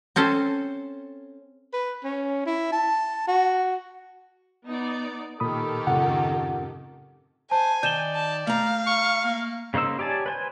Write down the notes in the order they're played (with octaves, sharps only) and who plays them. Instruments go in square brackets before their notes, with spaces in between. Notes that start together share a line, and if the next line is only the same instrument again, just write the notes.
[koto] C4 C#4 A4 C5
[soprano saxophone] B4
C#4
E4
A5
F#4
[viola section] B3 D#4 D5
[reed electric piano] A#2 B5 D#6 [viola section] D#3 G4 A4
[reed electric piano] F#2 A2 C4 [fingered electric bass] C#3 [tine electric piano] F4 F#5
[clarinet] C5 [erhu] G#5 [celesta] A5
[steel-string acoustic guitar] D#3 [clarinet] D5 [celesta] G6 E7 G7
[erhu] A5
[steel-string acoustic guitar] A3 A#5 [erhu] F5
[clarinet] C#6
A#3
[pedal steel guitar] C#3 A#3 D#4 C5 E6
G4 C#5 D5 G#5 A5
B4 C5 G#5